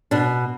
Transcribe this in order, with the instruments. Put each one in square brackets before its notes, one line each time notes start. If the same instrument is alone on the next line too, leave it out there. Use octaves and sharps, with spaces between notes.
[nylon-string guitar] B2 D4